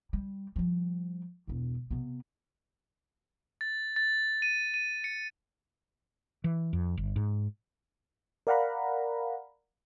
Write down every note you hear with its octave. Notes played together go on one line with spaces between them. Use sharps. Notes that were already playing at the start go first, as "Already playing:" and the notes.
G3
F3 G3
E1 C#2
C3 B3
A6
A6
D#7
D#7
C#7
E3
F2
G1
G#2
A#4 D5 F5 F#5 A#5 B5